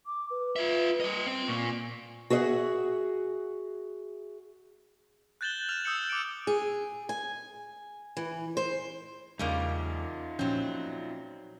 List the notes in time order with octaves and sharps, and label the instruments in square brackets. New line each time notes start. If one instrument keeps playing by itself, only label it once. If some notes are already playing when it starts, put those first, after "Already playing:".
[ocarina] D6
B4
[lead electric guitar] F4 E5
G3 D#5
C4
[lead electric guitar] A#2 [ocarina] C#6
[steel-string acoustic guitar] F#4 G#4 C5 D#5 E5 F#5
[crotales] F#6 G6 A6 E7 F#7 G7
F6 E7 F7
D#6 E6 G6 C#7 F#7
D6 D7
[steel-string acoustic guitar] G#4
G#5
E3
C5
[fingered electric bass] E2 G#3 [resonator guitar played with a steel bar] C#3 G3 A#3 [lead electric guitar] D#4 F4
[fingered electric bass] A#2 F3 [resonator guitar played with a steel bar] F#3 C4 [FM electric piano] C#4